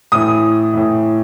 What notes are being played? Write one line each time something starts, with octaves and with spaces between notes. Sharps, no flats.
A2 E3 D#6
A2 E3